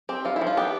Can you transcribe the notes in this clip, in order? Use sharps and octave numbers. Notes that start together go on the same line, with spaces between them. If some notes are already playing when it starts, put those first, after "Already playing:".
C4 G4
F3 F4
E4
F3
F4
B3 G4